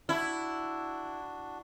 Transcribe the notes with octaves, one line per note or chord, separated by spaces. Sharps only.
D4 E4 F#4